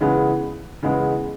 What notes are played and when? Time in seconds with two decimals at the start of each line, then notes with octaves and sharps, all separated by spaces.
0.01 C#3 E3 G#3 B3
0.83 C#3 E3 G#3 B3